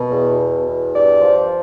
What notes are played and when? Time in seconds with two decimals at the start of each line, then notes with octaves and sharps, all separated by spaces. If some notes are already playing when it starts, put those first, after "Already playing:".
Already playing: B2
0.11 E2
0.39 B2
0.67 E2
0.94 G2 D5
1.20 F3